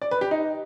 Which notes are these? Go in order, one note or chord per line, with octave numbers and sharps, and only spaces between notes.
D5
B4
G4
D#4